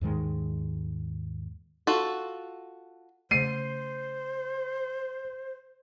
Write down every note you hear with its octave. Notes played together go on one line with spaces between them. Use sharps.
D#2 G#2 D#3 G#3
F4 F#4 A4
C#3 A3 C5 C7 D#7